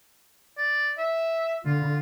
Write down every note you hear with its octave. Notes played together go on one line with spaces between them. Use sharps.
D5
E5
D3 F4